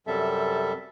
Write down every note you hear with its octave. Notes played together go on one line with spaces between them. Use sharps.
F#2 C3 G3 A4 E5